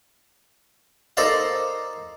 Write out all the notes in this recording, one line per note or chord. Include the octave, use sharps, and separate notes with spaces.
D#4 A4 A#4 C5 D5 F5